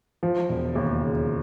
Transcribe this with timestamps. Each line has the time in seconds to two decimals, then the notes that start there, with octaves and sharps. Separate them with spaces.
0.23 F3
0.49 E1
0.76 D#2
1.01 C#3